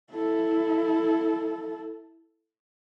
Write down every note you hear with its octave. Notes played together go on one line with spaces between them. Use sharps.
E4 A4